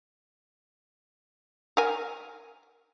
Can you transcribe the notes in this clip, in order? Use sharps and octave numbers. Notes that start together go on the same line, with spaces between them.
A#4 G#5